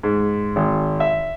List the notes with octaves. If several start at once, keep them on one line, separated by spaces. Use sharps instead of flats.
G#2
G#1
E5